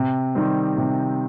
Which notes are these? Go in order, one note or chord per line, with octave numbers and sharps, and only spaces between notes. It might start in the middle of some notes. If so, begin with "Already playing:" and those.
Already playing: C3
D#3 G3 C4
C3